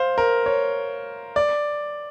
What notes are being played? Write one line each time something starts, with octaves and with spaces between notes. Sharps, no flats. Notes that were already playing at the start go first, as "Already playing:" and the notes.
Already playing: C5 F5
A#4
C#5
D5